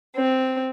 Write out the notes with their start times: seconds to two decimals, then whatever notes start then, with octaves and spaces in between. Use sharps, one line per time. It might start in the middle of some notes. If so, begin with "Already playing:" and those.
0.16 C4